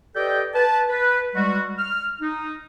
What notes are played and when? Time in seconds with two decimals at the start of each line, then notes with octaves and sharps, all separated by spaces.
0.16 G4 A4 B4 D5 D#5 G5
0.55 B4 A5
0.90 B4
1.35 G3 G#3 F#4
1.78 F6
2.21 D#4